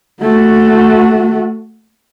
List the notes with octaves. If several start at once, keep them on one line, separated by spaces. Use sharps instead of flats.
A3 F#4